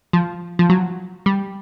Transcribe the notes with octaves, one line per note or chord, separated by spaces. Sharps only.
F3
F3
F#3
G3